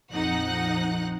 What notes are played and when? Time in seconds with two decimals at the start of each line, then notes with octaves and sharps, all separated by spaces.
0.12 A#1 F2 D#4 F#5 F#6